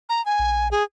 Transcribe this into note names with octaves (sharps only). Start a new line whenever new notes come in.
A#5
G#5
A#1
G#4